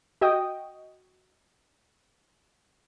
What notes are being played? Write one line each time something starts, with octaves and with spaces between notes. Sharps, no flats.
F#4 D#5 G5 D#6